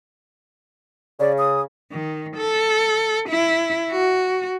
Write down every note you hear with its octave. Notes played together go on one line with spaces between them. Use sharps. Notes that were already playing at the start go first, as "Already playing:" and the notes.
C#3 D5
D#6
D#3
A4
E4
F#4